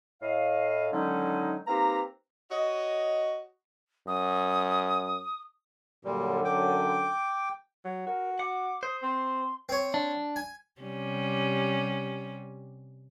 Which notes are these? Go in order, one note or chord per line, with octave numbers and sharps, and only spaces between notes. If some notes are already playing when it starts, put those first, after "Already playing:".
A2 D#5 F5
D3 D#3 F#3 G#3 C#4 D#4
A#3 C4 D#4 G4 B4 A#5
F#4 C#5 D#5
F#2 D#6
F#2 A#2 D3 G3
G5 D6
F#3
F#4 A#4
F#5 D6
C5 D#6
C4 C6
C4 C#5
D4
G#5
C3 G3 C#4